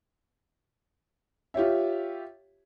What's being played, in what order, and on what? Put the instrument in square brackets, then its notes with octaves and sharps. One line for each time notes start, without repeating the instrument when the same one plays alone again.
[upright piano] F4 G4 C#5 E5